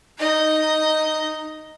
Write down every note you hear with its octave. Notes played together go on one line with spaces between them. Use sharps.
D#4 D#5